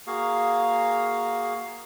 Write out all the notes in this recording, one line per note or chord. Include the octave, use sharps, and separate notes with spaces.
A#3 F#4 G#4 F5